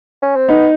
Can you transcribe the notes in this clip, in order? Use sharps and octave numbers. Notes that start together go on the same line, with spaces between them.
C#4
C4
B3 D#4